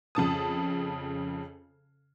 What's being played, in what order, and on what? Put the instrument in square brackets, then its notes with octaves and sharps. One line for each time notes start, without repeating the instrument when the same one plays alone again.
[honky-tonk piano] F2 C#3 A5 D#6